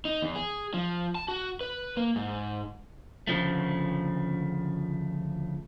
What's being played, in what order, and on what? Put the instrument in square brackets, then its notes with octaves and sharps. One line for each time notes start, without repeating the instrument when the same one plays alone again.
[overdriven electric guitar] D#4
E2
G#4
F3
A5
F#4
B4
A#3
G#2
[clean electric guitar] D2 C#3 F3 A3